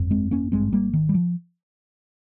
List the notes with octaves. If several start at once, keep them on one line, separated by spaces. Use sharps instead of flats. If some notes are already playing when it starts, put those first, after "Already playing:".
Already playing: G1 F2
G#3 C4
A#3 C#4
G#1 G2 G#3 C4
G3 A#3
D#3
G3
F3